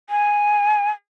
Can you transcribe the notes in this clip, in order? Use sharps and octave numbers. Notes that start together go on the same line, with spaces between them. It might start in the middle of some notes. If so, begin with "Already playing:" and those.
G#5